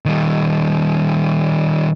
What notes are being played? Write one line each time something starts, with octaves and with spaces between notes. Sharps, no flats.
D#3 G3